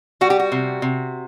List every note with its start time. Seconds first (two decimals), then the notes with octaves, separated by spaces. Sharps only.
0.21 G3 F#4
0.30 G4
0.39 F#4
0.52 C3
0.82 C3